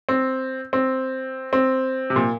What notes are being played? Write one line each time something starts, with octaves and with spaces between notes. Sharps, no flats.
C4
C4
C4
C3
A#2